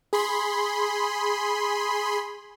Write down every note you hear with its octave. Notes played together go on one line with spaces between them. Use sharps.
G#4 B5 C6